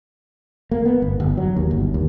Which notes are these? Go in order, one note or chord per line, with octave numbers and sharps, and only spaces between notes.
A#3
B3
G1
G1
F#3
D#2
G1
D#2